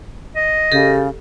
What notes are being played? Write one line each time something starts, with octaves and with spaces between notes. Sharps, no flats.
D#5
C#3 G4 A4